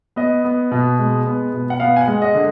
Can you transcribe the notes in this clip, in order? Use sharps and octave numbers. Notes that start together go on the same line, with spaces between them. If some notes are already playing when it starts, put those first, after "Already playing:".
B3 D#5
B3
B2
G#3
B3
B2
F#5
B3 F5
G#5
F#5
G#3
D#5
D3